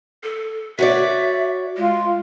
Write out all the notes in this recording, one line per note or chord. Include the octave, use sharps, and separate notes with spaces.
A4
F#4 C#5 D5 E5
G#3 F4